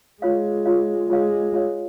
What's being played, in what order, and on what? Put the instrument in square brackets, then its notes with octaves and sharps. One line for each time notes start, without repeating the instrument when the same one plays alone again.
[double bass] G#3 [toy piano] F4 C#5 F5
[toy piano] F4 C#5 F5
[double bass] G#3 [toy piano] F4 C#5 F5
[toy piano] F4 C#5 F5